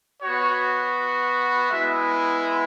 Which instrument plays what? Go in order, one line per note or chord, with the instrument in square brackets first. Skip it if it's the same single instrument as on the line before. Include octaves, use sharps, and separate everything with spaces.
[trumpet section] B3 F#4 C#5
G#3 B3 E4 E5